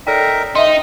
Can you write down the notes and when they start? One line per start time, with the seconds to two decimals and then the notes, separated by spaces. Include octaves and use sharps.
0.07 D#4 A4 A#4 D5 E5 G5
0.55 D#4 E5 C6 D#6